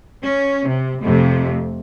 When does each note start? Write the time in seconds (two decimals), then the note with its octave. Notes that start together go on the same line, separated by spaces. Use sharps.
0.23 C#4
0.68 C3
1.01 F2 C3 A3